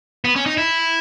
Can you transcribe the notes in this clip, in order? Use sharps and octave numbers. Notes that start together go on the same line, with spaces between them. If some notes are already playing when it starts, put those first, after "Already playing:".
B3
C#4
D#4
E4